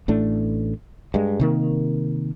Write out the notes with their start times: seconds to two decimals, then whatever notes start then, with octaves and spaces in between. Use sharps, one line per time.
0.08 A1 A2 A3 D4
1.14 G2 G#3
1.40 C3 D#3 A#3